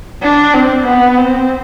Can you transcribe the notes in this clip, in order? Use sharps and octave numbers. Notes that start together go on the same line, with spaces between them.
D4
C4
B3
C4